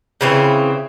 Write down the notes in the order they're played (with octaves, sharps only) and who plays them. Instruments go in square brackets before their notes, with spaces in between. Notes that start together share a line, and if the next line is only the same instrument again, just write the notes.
[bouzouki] C#3 E3 C4